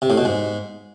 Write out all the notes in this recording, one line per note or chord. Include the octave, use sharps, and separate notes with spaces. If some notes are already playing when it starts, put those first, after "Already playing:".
C3
A2
B2
G#2